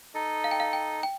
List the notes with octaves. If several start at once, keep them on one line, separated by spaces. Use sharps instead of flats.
D#4 A4 D#5
F5
G5
F5
G5
G5